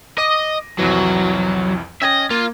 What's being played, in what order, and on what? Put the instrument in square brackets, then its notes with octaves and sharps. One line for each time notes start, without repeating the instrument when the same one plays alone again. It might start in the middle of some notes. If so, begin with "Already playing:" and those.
[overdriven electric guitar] D#5 [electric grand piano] D6 A#6 D#7
[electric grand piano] C2 F2 E3 [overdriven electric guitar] F#3
[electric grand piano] C#4 G5 G#6 [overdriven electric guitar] D#5 E5
[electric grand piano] A#3 [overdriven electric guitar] F4